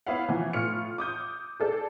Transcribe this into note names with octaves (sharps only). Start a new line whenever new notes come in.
B3 E4 C#5 F5 F#5
B2 E3 F3
A2 F4 F6 C#7
D6 D#6 G6
G#4 A4 D5